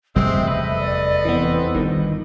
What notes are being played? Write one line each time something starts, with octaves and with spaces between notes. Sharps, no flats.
F1 E2 G3 G#3 C4 E5
A4 B4 D#5
D5
E3 B3 C4
G1 G2 D#3 D#4